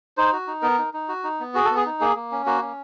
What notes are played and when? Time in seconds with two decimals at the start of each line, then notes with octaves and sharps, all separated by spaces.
0.17 D#4 C5
0.33 F#4
0.47 D#4
0.62 B3 A#4
0.78 D#4
0.93 D#4
1.09 F#4
1.24 D#4
1.40 B3
1.54 F#4 G#4
1.65 A4
1.70 B3
1.76 G#4
1.86 D#4
2.00 A#3 G#4
2.16 A#3
2.32 C#4
2.46 A#3 F#4
2.62 C#4